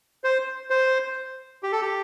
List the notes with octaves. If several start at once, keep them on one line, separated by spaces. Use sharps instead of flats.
C5
C5
G4
A4
G4